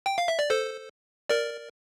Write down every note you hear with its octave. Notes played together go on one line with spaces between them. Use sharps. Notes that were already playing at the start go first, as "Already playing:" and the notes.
G5
F5
E5
D5
A4 C5
A#4 D5